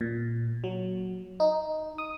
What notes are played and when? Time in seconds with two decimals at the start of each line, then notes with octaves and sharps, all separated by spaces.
0.01 A#2
0.64 F#3
1.40 D#4
1.98 D#6